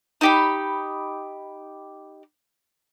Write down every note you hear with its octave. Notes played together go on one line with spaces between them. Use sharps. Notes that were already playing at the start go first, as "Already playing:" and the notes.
D#4 G4 B5